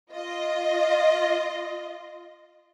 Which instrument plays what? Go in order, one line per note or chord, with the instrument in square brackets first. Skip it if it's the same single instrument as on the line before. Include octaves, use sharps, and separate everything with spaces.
[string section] F4 D#5